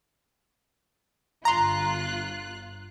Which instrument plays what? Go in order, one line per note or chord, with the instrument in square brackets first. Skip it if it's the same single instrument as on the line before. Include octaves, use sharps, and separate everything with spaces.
[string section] G1 F4 F#6 [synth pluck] A#5 C6